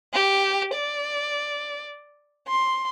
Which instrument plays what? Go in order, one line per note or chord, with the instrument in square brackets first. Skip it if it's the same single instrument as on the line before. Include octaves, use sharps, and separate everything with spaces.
[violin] G4
D5
C6